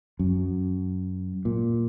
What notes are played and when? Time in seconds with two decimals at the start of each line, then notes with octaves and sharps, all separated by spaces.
0.19 F#2
1.45 A#2